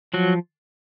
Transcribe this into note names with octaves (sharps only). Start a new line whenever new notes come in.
F3 F#3 F#4